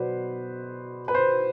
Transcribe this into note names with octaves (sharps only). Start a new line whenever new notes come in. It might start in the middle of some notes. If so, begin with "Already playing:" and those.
Already playing: B2 F#3 B3 B4 C5 D5
B4
C5